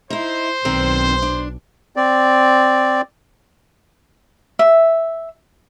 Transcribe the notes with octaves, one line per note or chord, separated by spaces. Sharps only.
D#4 E4 C5
B1 D#3 C4 D4
D4
C4 D5
E5